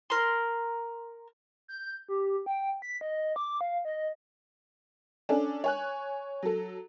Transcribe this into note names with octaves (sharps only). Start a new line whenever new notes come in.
A#4 C6
G6
G4
G5
B6
D#5
D6
F5
D#5
C#4 D4 A4 D5
C#5 G#5 F#6
F#3 A4